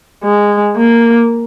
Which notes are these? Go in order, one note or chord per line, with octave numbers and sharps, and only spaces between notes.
G#3
A#3